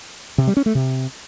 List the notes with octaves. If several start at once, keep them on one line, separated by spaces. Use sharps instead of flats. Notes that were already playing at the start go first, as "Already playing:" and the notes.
C3
G3
C#4
A3
C3